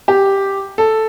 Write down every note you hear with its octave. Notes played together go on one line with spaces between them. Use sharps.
G4
A4